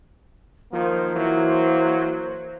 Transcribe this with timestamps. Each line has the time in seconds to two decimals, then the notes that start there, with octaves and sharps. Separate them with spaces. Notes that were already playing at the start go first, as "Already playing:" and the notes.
0.73 D#3 F3 A#3 C5
1.16 E3 F#3